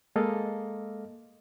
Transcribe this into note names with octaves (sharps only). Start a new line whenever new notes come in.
G#3 A#3 A4 D#5 F5